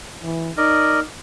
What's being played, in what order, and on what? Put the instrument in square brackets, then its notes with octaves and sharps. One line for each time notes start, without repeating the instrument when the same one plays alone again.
[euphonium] E3
[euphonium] D#4 [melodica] A#4 D5 D#5